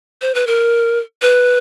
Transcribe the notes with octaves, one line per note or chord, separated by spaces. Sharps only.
C5
B4
A#4
B4